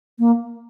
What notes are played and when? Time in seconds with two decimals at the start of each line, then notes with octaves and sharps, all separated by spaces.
0.19 A#3